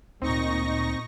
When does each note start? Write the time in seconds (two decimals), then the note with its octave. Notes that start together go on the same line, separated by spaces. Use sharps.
0.22 D2 A#2 C4 D#4 C#6 A#6